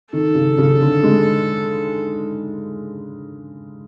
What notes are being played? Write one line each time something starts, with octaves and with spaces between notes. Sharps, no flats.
D#3 A4
C#3
C#3
D3
G#3